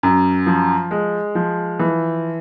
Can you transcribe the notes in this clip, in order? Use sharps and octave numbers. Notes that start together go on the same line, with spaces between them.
F#2
F3
G#3
F3
E3